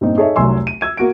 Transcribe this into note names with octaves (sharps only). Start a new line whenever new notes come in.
G2 A#2 C4 D#4
D#4 G#4 A4 C#5 E5
F1 C2 F#3 G#5 C6 E6
D#7
E6 G#6 D#7
A#3 F#4 D7